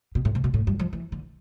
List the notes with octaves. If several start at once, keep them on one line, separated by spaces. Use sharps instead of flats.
B2
A2
C3
B2
A2
G2
F3
E3
D3